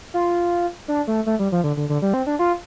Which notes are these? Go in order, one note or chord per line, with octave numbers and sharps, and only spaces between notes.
F4
D4
A3
A3
G3
F3
D3
D3
D3
G3
C4
D4
F4